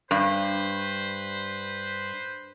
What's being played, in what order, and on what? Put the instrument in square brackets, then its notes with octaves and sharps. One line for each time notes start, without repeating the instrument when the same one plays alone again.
[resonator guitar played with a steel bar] G2 [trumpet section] B4 C5